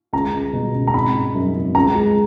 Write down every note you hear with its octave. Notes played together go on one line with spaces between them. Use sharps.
C#2 A#5
C#2
B2
C#2
A#5
G#1 B5
C#3
F#2
C#3
C#2 A#5
G#3